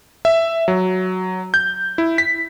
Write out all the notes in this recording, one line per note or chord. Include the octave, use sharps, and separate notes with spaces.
E5
F#3
G6
E4
B6